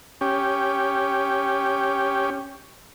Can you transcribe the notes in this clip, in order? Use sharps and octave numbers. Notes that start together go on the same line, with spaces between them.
C#4 G4